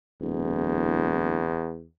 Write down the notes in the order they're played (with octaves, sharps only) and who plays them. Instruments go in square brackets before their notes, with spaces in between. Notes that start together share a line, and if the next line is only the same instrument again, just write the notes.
[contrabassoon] D1 [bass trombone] E2